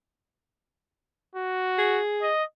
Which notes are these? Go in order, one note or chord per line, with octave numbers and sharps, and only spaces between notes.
F#4
G#4
D#5